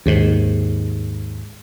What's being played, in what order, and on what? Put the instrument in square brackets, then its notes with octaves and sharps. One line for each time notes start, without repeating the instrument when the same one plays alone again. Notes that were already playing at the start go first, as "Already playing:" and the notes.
[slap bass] D#2 G#2